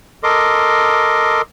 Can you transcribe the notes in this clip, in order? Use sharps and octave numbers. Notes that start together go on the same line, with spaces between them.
A4 A#4 D#5 C6 D6